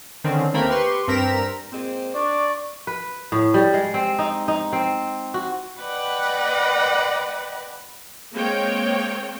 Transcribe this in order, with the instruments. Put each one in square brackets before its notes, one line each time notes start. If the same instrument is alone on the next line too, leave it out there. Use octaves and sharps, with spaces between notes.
[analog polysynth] D3 D#3 C4 C#4
D#2 A3 A#3 C4 A#4 B5
G4 B4 C6 C#6
G2 C4 A#4 A#5 B6 E7
[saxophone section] A#2 G#3 C4
[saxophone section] D4 [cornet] D5 [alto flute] C#6
[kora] B4
A2
G3
G#3
C4
D#4
D#4
C4
F#4
[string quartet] B4 D5 D#5 F#5 G5 B5
[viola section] G#3 A#3 C4 C#5 G5